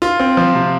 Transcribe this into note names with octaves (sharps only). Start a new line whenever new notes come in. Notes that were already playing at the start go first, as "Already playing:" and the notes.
F4
C4
F3
C3